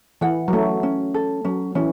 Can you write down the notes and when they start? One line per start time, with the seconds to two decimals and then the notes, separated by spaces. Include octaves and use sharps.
0.21 E3 F#5
0.48 F#3
0.53 A3 C#4
0.83 C#4
1.14 A4
1.45 F#3 C#4
1.75 E3 C#4